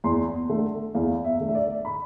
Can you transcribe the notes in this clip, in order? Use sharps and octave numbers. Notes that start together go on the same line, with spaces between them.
E2 C6
D3 A3
E2 F5
E5
D3 A3
E5
D5
B5